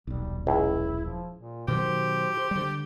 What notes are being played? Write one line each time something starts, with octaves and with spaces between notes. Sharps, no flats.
D#1 B1 G3
C#2 E4
F3
A#2
B2 D#3 F#3 G4 C5
D3 G3